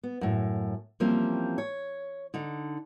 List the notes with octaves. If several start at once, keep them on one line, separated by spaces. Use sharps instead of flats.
B3
F#2 A2
E3 F3 G3 A#3 C4 C#4
C#5
D3 D#4